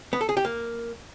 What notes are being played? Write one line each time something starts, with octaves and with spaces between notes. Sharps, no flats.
B3
A4
G#4
G4
A#3